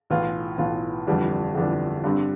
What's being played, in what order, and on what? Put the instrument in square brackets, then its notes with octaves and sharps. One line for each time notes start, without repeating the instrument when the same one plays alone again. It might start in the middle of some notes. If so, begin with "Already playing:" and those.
[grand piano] B1 A2 E3 B3 F4
B1 A2 E3 B3 F4
G1 F2 E3 G3 D4
G1 F2 E3 G3 D4
G2 D3 G3 C4